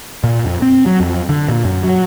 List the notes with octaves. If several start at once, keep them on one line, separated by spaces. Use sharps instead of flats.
A#2
F2
C4
F#3
F2
D3
A#2
F#2
F#3